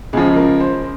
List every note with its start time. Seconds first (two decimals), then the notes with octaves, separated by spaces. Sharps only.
0.13 C#2 C#3 F3 G#4
0.36 A#4
0.60 C5